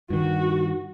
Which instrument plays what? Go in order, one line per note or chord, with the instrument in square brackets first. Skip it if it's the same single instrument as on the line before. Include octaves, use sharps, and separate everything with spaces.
[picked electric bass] G2 D#3 [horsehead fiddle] F#4